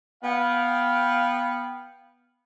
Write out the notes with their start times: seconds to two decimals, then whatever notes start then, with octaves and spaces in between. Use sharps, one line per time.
0.24 B3 F5 G5